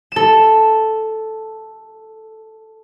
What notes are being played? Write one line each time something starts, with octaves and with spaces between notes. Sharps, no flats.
A4 E7